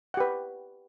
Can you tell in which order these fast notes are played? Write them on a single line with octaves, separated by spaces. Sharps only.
F#5 G4 B4